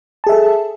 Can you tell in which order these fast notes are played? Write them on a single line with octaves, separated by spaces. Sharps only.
A5 G#4 E5 A4